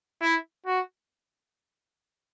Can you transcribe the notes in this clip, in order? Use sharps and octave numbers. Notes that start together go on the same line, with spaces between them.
E4
F#4